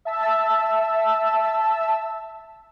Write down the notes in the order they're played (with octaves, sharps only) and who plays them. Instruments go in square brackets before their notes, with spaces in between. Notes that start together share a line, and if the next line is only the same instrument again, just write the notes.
[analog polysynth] E5 A5 E6